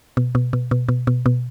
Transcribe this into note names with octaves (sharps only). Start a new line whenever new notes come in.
B2
B2
B2
B2
B2
B2
B2